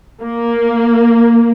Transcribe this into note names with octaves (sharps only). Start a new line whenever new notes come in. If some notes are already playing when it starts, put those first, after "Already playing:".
A#3